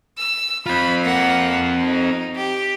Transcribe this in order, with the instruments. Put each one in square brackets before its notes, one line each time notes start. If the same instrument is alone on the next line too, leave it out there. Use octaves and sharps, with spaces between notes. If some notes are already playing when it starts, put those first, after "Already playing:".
[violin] E6
[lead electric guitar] C4 F4 [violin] B5
[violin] A#3 F#5
D#4
G4